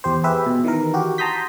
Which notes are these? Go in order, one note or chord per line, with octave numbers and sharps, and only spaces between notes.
E2 G4 C5
G4 G#4 B4 E5
B2
D#3 E3 A#4
F#4 G4
A5 A#5 C6 D#6 G6 B6